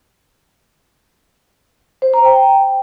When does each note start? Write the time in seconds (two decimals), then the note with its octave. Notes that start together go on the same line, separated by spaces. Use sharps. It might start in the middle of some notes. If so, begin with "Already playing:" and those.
2.02 C5
2.14 A#5
2.25 G5